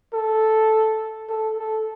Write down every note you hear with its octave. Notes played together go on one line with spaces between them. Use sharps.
A4
A4
A4